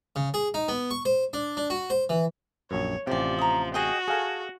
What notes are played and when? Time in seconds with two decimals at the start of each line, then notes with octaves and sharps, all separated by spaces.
0.16 C#3
0.34 G#4
0.54 D#4
0.68 B3
0.91 C#6
1.05 C5
1.33 D4
1.57 D4
1.70 F#4
1.90 C5
2.10 E3
2.71 A#1 F#2 C#5
3.07 A1 C3 F3 G4 D5
3.39 A#5 D#6
3.74 F#4 G#4 D#5 G5
4.08 G#4 A4 F5 G#5